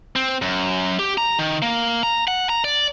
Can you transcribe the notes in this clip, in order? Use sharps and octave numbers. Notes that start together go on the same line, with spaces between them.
C4
F#2
G4
A#5
D#3
A#3
A#5
F#5
A#5
D5